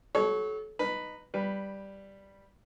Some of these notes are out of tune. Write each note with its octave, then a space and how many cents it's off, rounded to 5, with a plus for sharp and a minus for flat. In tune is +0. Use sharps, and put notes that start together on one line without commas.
F#4 +30 A4 -35 C#5 +0
D#4 -15 B4 +0
G3 +0 B4 +0